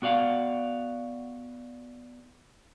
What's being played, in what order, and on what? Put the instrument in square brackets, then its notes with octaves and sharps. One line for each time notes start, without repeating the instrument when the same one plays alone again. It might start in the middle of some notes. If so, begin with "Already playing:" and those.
[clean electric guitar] B3 F#4 D5 F5 F#5